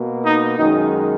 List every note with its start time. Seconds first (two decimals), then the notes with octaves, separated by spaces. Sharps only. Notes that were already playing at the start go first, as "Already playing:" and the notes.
Already playing: B2 A#3
0.23 D#4
0.57 F#2 D#3 G#3 D#4